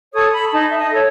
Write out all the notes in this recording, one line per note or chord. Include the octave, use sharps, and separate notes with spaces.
A4 C#5 D#6
B5
D#4 A5
E5
D#5
A4 C#5